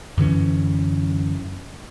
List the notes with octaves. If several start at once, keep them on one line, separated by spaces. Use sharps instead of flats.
F#2 D3 E3 C#4